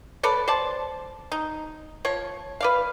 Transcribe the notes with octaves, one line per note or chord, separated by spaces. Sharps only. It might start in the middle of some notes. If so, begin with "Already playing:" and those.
A4 B4 C#5 D5
C5 D5 A5
D#4
F3 C#5
B4 D5 F5